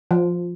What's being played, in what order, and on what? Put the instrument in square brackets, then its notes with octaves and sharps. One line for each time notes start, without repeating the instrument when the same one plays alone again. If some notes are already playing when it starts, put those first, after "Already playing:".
[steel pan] F3